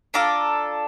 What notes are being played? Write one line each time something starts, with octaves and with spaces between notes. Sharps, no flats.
D4 F4 A4 A#5 D6